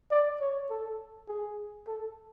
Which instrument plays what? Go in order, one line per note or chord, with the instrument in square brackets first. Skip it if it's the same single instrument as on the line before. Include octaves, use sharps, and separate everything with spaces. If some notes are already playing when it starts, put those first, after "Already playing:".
[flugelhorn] D5
C#5
A4
G#4
A4